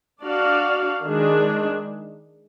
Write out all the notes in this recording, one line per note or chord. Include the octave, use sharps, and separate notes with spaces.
D4 F#4 D5 F5
D#3 G#3 D4 G#4